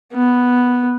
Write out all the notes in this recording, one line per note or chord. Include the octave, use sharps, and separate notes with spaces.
B3